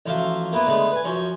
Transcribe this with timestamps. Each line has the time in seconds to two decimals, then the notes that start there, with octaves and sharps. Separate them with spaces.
0.06 A1 F3 F#3 F4 E5 F5
0.52 A#3 B3 E4 B4
0.67 D3 G#3 A3 B3 B4
0.91 B4 G#5
1.04 F#2 F3 C#4 C#6